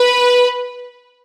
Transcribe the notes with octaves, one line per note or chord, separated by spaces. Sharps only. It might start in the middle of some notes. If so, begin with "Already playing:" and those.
Already playing: B4